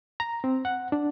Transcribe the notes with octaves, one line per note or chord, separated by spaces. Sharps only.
A#5
C4
F#5
D4